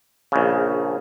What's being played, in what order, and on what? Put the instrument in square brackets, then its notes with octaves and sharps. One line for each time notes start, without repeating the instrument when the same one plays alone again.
[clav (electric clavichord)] A#1 C#3